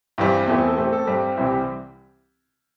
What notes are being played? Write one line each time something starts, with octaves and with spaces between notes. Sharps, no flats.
G2 E3 G3 C4 G4
E2 E3 A3 C4 G4
E4
A4
A2 A3 C4 G4
A4
G2 G3 C4 G4
C2 C3 E3 G3 C4 E4
G4